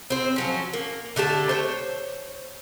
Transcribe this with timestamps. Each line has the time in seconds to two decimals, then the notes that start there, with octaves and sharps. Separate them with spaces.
0.10 C4 C5
0.36 F3 F#3 C#4
0.73 A#3
1.16 D3 A3 G4 A5
1.49 C5 C#5